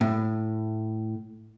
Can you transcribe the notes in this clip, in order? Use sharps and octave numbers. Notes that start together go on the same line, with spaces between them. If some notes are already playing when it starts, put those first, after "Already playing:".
A2